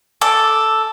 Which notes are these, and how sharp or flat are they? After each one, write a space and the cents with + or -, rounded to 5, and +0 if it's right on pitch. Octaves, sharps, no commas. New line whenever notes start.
A4 +0 D6 +0